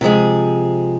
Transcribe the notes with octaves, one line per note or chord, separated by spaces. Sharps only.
C3 F3 G#3 G#4